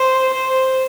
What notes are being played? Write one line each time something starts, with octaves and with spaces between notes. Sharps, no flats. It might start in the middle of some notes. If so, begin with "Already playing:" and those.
Already playing: C5
C5